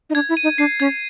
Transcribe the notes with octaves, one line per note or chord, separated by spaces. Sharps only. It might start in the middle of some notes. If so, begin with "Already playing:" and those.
D#4
D4 G#6
E4
D#7
D#4
D4 C7
C#4 G#6